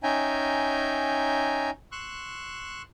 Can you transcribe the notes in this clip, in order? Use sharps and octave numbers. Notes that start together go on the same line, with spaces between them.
C#4 D#4 E5 G5 G#5 A#5
C6 C#6 E6 F#6